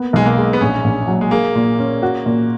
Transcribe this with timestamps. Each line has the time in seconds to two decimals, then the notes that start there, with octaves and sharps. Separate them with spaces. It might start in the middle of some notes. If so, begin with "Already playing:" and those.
Already playing: A#3 B3
0.13 B1 G#3
0.26 A#3
0.37 G#3
0.53 B3
0.61 A#1 C#4
0.84 A#1
1.08 F#3
1.21 G#3
1.31 A#3 G#4
1.55 A#2
1.79 C#4
2.03 F#4
2.26 A#2